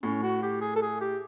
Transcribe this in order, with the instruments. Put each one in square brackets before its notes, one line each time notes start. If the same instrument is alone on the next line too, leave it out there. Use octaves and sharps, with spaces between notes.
[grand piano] A2 [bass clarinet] C#4
[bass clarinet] F#4
G4
G#4
A4
G#4
G4